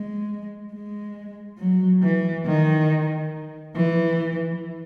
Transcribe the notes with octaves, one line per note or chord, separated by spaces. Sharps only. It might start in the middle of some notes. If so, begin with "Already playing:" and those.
Already playing: G#3
G#3
F#3
E3
D#3
E3